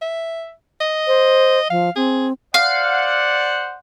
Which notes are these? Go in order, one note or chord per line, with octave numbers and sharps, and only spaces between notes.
E5
D#5
C5
F3 F5
C4 G#4
C5 D5 F5 F#5